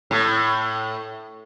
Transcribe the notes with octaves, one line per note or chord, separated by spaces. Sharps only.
A2